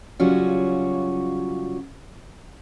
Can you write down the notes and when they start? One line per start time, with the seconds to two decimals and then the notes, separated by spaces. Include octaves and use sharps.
0.20 C#3 F#3 G3 C#4 F4 F#4